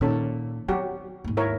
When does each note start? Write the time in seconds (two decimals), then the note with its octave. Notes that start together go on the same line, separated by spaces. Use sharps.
0.01 A#2 D#3 C#4 A4
0.68 F#3 C4 F#4 G4
1.24 D#2 G#2
1.37 E4 A#4 C#5